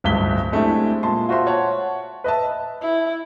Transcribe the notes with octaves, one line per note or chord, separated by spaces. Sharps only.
D1 C#2 G2 B6 G7
G#3 A3 C4 D4 E4 G4
A#2 G#3 A5 C6
F4 F#4 C5 E5 C6
C#5 F#5 A5
B4 D#5 E5 A5
E4